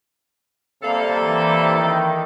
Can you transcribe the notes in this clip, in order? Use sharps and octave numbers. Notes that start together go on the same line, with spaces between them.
C3 G3 A#3 A4 F5
E3
D#3